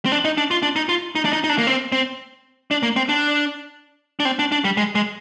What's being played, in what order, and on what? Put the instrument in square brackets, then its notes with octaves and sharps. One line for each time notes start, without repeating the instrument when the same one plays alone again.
[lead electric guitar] C4
D4
D#4
D4
F4
D4
D#4
F4
D#4
D4
D#4
D#4
D4
A#3
C4
C4
D4
A#3
C4
D4
D4
C4
D4
D4
G3
G#3
G#3